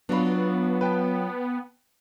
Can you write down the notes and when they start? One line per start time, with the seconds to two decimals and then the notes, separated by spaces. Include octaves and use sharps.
0.09 F#3 B3 D4 F4 F#4 B5
0.81 B4 G5 A5